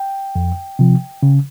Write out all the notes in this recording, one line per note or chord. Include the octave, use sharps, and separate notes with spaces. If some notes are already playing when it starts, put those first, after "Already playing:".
Already playing: G5
F2
C3 F3
C#3